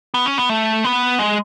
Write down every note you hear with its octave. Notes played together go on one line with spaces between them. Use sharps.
B3
C#4
B3
A3
B3
G#3